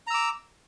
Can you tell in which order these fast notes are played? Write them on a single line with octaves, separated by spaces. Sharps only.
A#5 E6 D6